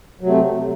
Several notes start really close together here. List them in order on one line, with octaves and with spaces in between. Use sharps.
F#3 C3 A3